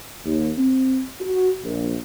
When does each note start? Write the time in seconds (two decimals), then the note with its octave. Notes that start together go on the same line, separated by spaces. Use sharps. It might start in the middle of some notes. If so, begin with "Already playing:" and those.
0.24 D#2
0.57 C4
1.20 F#4
1.63 A#1